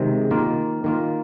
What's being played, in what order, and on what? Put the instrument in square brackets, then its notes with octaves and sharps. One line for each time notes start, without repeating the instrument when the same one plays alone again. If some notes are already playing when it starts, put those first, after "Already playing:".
Already playing: [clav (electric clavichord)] C3 D#3 G#3
D#3 A#3 F4
D#3 A#3 F4